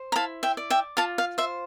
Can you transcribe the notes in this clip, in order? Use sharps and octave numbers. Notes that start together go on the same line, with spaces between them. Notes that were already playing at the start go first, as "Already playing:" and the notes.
Already playing: C5
A#5
E4 F5 A5
E5 G5
D5
E5 G5
F4 F5 A5
F5
C5 E5